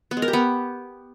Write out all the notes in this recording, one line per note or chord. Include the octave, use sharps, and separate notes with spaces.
B3
G#3
A#4
G4
B3